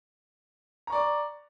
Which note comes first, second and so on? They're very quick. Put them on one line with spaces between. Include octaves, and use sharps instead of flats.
A#5 C#6 D5 D6